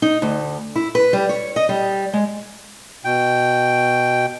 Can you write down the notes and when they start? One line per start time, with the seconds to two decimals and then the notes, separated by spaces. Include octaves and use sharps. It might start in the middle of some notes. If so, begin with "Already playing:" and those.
0.02 D#4
0.22 D2
0.76 E4
0.95 B4
1.13 G3
1.29 C#5
1.56 D#5
1.69 G3
2.13 G#3
3.05 B2 G5